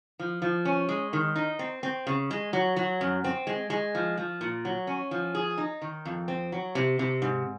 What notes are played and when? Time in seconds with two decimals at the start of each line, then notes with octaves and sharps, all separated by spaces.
0.19 F3
0.42 F3
0.65 C#4
0.89 G#3
1.13 D#3
1.36 D#4
1.59 C4
1.83 C4
2.07 C#3
2.31 G#3
2.53 F#3
2.76 F#3
3.01 F#2
3.24 C4
3.47 G#3
3.70 G#3
3.95 F3
4.17 F3
4.41 A#2
4.65 F#3
4.87 C#4
5.11 F3
5.35 G#4
5.58 D#4
5.82 D#3
6.05 F2
6.28 C4
6.52 F#3
6.75 C3
6.99 C3
7.22 G#2